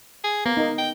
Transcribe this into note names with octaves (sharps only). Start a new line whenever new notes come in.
G#4
A#3 B3
D#4 A#4
G5